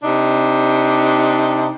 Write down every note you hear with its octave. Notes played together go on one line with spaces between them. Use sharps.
C3 D4 D#4